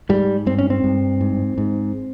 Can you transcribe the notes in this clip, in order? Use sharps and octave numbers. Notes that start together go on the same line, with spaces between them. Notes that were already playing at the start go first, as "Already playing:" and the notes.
G#2 G3
G2 C4
C#4
C4
G2
G#2
G#2